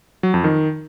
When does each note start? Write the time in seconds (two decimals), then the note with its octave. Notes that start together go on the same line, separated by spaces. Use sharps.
0.23 F#3
0.34 F2
0.44 D#3